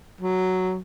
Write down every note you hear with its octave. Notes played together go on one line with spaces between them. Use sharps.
F#3